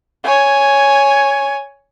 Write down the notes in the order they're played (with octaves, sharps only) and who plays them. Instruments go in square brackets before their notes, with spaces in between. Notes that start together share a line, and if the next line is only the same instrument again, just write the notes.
[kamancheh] C#5 G#5